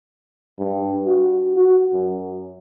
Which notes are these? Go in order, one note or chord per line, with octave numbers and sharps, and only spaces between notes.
G2
F#4
F#4
F#2